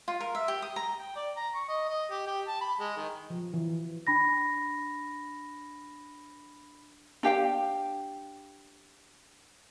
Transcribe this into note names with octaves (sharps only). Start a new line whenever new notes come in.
F4
A#4
E5
G4
D#6
A#5
G5
D5
A#5
C#6
D#5
D#5
G4
G4
A5
B5
G#3
D#3
F3
E3
D4 B5 A#6
D4 G4 F5 G5